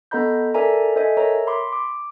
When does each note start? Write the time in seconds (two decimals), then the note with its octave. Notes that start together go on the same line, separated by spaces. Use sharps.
0.11 B3 A4 D#5 A#5 B5 G6
0.54 A4 A#4 D5 E5 G#5 A#5
0.96 A4 C5 D#5 E5 G#5
1.17 A#4 C#5 E5 A#5
1.47 B5 C6 D6
1.73 D6